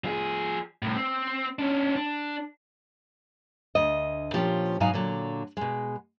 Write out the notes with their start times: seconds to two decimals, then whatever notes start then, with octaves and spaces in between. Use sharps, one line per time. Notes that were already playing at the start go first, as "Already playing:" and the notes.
0.04 F3 G#4
0.82 C2 A2
0.96 C4
1.59 C#4 D4
1.96 D4
3.75 D2 D#5
4.33 A#2 F3 C#4 G4
4.80 G#2 B2 F#3 D#4 F5 G#5
4.94 A#2 D3 F#3
5.57 B2 G#3